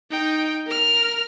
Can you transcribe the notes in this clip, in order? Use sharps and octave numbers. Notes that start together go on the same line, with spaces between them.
D#4 G5
A#4 F6